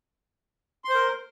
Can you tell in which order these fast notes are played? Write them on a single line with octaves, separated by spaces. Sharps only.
C6 C5 A#4